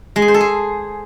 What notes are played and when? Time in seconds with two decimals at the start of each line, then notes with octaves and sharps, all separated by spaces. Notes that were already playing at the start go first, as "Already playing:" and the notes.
0.16 G#3
0.22 G#4
0.28 C5
0.34 A4
0.41 G#4